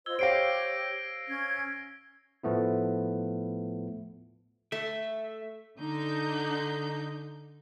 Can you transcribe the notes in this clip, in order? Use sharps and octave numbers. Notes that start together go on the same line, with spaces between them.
F4 C5 D#5 E6 G#6 G7
G4 C5 C#5 F5 A#6 C7 D7
C#4 G#6
A2 F3 A3 B3 E4
A3 E5
D3 D#4 G6